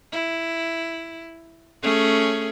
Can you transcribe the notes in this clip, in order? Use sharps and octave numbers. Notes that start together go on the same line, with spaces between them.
E4
A3 C#4 G#4